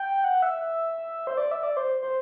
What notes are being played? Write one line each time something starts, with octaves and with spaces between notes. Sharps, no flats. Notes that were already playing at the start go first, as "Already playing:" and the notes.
Already playing: G5
F#5
E5
C5
D5
E5
D5
C5
C5